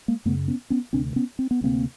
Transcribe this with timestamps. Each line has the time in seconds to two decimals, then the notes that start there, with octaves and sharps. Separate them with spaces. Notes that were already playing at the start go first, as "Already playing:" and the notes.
0.08 G#3 A#3
0.25 F#2 C#3 A3 B3
0.48 B3 C#4
0.70 B3 C#4
0.93 D2 C3 C4 D4
1.16 B3 C#4
1.39 C4
1.51 B3
1.61 D2 C3 A#3 C4